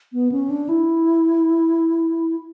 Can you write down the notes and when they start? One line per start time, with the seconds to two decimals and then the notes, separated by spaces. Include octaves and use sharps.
0.13 B3
0.32 C#4
0.50 D4
0.69 E4